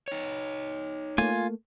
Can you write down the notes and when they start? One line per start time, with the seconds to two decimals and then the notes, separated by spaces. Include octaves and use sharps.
0.08 D#4 C#5
1.18 A3 A#3 F4 G#5